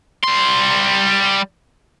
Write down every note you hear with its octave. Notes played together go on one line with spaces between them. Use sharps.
G3 C6